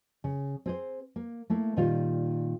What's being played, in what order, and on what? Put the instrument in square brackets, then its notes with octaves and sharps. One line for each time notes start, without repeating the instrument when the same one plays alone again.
[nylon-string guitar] C#3
C4 G#4 C5
A#3
A3 A#3 E4
A#2 D#3 G3 F4